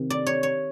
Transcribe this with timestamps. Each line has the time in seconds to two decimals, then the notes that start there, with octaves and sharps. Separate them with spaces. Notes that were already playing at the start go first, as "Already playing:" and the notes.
Already playing: C3 D#3
0.10 D5
0.27 C#5
0.43 C#5